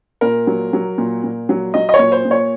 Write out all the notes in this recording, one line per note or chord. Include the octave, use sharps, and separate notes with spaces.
A#2 A#4
F#3
F#3
A#2
A#2
F#3
F#3 D#5
D#5
C#5
A#2
C5
A#2
C#5